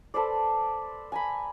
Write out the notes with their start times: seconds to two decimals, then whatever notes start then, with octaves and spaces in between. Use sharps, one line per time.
0.14 A4 B4 C5 D5
1.12 G#5 A#5 B5